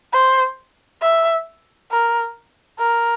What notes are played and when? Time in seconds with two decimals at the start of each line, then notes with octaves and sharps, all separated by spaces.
0.13 C5
1.01 E5
1.91 A#4
2.79 A#4